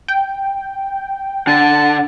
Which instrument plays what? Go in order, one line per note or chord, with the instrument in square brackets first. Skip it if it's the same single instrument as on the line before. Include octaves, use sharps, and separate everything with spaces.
[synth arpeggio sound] G5
[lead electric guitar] D3 [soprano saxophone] A5